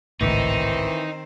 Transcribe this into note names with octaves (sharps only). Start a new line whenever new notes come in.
G#1 C#2 A2 D#3 E3 C4 D#4